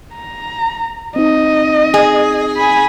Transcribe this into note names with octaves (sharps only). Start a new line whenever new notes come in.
A#5
C4 D#4 D#5
G#4
G#5 B5